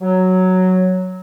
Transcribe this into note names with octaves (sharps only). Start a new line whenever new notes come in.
F#3